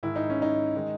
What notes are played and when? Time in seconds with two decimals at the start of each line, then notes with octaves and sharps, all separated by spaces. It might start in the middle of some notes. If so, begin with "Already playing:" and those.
0.03 G#2 D#3 G#3 E4
0.16 D#4
0.30 C#4
0.42 D#4
0.76 D#3 G#3